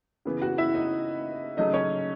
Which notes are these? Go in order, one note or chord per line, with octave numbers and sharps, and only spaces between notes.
C#3 E3 B3
F#4 F#5
E4 E5
D#4 D#5
C#3 F#3 A3 D#4 D#5
C#4 C#5